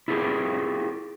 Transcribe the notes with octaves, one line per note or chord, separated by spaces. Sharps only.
E4 F4 G4 G#4 A#4